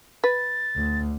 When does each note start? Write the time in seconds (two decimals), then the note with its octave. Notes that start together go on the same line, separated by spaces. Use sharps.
0.24 B4 A6
0.76 D2